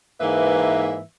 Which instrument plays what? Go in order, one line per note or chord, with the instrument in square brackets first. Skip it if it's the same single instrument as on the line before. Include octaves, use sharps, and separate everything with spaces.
[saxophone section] G#2 E3 A#3 B4 E5